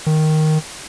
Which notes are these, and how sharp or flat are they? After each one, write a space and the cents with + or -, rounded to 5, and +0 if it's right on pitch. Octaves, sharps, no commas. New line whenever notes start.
D#3 +0